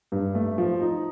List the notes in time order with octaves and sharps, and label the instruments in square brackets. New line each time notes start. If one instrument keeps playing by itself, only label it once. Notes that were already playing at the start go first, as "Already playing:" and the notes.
[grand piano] G2
A3
F3
D#4